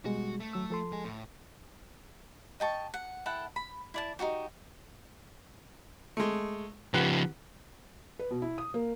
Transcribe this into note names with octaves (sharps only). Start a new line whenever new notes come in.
B2 G3 G#3 F#4
A3
D#2 F#3 E6
F3 A4 C6
G#3 G#4
A2
D#5 G5 A5 C#6
F#5
E4 A4 F#5 G5
B5
E4 D5 A5
D#4 E4 F#4 G4
G#3 A3
C#3 F3 G4 B4 F#5
B4
B2
E4
D#6
A#3